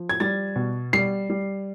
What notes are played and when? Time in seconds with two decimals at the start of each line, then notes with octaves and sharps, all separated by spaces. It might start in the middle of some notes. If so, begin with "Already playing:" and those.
Already playing: F3
0.09 G#6
0.20 G3 A6
0.56 B2
0.93 G3 C7
1.30 G3